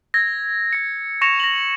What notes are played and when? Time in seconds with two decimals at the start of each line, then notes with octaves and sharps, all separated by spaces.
0.14 E6 G#6 A#6
0.73 A#6 C#7
1.21 C#6 A#6 C#7 E7 F7
1.40 A#6 F#7